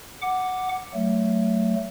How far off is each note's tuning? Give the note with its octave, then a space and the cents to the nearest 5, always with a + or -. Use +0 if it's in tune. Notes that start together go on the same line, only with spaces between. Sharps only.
F#5 +0 D6 +0
F#3 +25 A3 +15